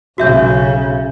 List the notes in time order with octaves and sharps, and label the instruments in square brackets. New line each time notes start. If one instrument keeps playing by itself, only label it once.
[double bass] B1 C#3 [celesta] F#4 E5 G6